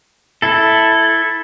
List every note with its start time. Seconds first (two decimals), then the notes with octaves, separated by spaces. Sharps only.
0.42 E4 A4